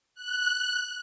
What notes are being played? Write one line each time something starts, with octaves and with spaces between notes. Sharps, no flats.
F#6